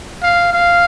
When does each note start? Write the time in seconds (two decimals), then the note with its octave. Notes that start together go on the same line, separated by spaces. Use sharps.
0.23 F5
0.53 F5